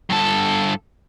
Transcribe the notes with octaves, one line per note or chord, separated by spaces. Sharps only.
G2 A4